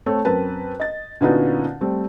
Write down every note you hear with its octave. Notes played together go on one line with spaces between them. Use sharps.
A3 C4 A4 C#5
F#2 C4 A#4 B4 A5
D#5 A6
A#2 D3 B3 C#4 D#4 F#4
G3 A3 C4